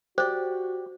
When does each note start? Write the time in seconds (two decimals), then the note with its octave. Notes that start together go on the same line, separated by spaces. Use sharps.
0.18 F#4 G4 C5 D5